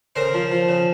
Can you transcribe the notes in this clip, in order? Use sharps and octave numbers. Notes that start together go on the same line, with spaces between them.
C#3 A#4 C5
F3
F3
C#3